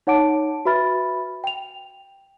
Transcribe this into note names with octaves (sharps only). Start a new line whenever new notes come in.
D#4 C#5 F#5 A5 D6 D7
F#4 B4 E5 B5 F6 A6
G5 F7